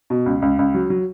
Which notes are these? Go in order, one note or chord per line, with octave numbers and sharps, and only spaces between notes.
B2
C#2
C#2
C#2
F#3
F#3